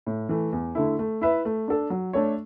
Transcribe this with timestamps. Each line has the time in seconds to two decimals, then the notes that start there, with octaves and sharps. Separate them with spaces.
0.06 A2
0.29 E3 A3
0.52 E2
0.75 D3 A3 E4
0.99 A3
1.21 E4 B4 E5
1.45 A3
1.68 D4 A4
1.90 F#3
2.13 A3 D4 A4 C#5